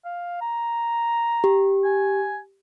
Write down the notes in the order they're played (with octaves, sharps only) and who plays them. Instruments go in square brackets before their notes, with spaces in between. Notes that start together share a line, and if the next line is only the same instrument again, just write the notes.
[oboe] F5
A#5
[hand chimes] G4
[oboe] G#5